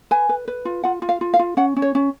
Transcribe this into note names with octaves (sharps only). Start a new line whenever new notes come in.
B4 G#5
B4
B4
F4
F4 F#5
F4
F5
F4
F5
F4
C#4 F#5
C#4
C#5
C#4